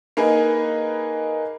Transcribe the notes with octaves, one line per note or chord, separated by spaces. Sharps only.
A#3 D#4 G#4 B4